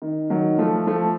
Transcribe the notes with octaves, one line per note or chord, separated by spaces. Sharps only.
D#3
D#3 F#3
F3 A3
F3 A3